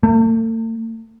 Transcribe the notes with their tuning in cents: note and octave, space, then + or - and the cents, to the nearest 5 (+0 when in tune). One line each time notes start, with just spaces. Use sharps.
A3 +45